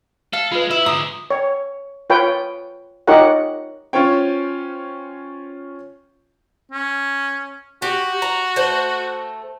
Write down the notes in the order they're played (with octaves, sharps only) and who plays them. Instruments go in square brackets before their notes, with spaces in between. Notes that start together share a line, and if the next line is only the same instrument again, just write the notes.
[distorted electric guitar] A4 [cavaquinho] F5
[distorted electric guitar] G#3 [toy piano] F4 B4
[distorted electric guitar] E4 [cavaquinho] E5
[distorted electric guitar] G#2 D3 [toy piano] A#5 [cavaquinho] D#6
[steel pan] C#5
F4 B4 C#5 G5
D#4 F4 G4 A#4 C#5 F#5
[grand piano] C#4 F4 C5 C#5 G5
[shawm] C#4
[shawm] F#4 [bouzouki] G4
[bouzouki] A#5
A3 C5